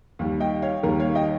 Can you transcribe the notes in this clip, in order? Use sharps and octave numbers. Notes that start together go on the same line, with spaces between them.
D#2 D#3 G3
D#5 G5
C#5 F5
D#2 D#3 G3 A#4
C#5 F5
D#5 G5